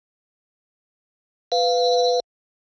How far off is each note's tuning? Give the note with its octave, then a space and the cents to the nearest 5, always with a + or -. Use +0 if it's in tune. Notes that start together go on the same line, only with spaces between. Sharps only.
B4 +5 F5 +0